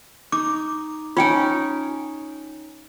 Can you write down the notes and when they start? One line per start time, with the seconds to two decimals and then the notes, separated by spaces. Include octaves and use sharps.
0.32 D#4 D6
1.17 C#4 D#4 F4 G5 G#5